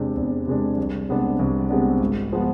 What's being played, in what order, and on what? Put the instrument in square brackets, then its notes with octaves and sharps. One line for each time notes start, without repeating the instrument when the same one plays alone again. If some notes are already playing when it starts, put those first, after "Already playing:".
Already playing: [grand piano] E2 C3 G#3 D4
E2
C3 G#3 D4
C2
C3 G#3 B3 D4
C2
C3 G#3 B3 D4
G#1
F3 G#3 B3